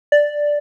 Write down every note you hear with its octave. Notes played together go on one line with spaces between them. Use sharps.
D5